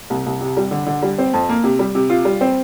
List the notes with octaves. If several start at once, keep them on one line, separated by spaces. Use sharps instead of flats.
C2
C2
C3
G3
D3
D3
G3
C4
F2
A#3
C3
G3
C3
F4
G3
C4